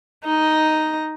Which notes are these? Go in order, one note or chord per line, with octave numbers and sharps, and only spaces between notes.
D#4 D#5